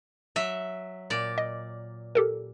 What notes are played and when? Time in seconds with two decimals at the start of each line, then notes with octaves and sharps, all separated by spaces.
0.36 F#3 E5
1.10 A#2 D5
1.38 D#5
2.15 G4 A4 A#4